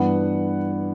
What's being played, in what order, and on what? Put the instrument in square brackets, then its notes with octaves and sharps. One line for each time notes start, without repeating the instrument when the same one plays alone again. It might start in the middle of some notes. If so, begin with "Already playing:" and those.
Already playing: [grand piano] G2 E3 B3 F#5